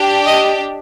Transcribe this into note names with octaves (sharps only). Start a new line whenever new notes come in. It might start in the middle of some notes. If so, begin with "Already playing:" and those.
Already playing: D4 G4
D#5